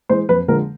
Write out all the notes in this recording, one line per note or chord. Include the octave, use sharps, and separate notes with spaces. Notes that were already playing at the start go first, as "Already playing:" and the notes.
E3 G#3 C5
F2 B4
D3 F3 G#3 A#4